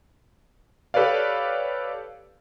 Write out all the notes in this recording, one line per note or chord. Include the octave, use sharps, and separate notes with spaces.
G4 A4 B4 C#5 D5 F5